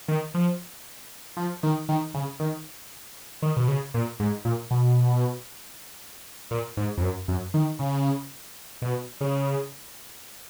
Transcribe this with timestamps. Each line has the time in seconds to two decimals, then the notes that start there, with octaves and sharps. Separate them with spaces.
0.08 D#3
0.34 F3
1.37 F3
1.63 D#3
1.89 D#3
2.14 C#3
2.40 D#3
3.42 D#3
3.57 B2
3.68 C#3
3.94 A#2
4.20 G#2
4.45 A#2
4.71 B2
6.51 A#2
6.77 G#2
6.97 F2
7.02 F#2
7.28 F#2
7.54 D#3
7.79 C#3
8.82 B2
9.21 C#3